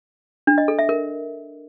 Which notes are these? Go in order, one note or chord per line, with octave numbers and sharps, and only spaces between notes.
D4
D#5
A4
E5
A#4